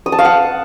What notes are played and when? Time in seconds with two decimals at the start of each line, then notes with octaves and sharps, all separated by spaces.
0.06 D#6
0.12 A5
0.19 F5
0.25 F#5